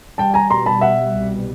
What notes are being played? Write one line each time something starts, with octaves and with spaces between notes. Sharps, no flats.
G3 G5 A5
G#5 A#5
B2 A#5 C6
A5 B5
B2 E5 F#5
C2